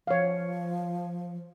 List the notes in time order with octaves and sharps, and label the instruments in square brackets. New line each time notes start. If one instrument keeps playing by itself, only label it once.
[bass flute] F3 [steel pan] C#5 F5